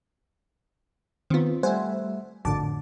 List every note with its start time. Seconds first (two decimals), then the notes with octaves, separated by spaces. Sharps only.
1.30 D#3 B3 C4 F4
1.63 G3 A3 C5 E5 F#5 G#5
2.45 G#1 F2 A2 D3 A5 D6